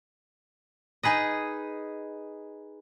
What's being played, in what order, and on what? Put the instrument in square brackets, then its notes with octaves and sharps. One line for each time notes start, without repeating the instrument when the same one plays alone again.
[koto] D#4 G#4 B4 D#5